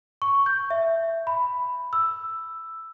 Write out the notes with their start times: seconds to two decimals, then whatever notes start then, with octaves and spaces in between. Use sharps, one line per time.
0.22 C#6
0.46 G6
0.70 E5
1.27 B5
1.93 E6